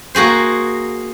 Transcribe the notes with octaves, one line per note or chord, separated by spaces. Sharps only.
A#3 F#4 G#4 C5